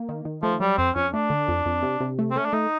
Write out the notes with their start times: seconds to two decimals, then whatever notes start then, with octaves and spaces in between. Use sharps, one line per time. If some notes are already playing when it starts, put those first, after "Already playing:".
Already playing: A#3
0.09 D#3
0.25 D#3
0.43 F3 A3
0.60 F#3 G3
0.78 F2 C4
0.96 F2 C#4
1.13 A3 D4
1.30 D3
1.48 F2
1.66 F2
1.82 C3
2.00 C3
2.19 A3
2.31 C4
2.36 A3 C#4
2.45 D4
2.53 A3 D#4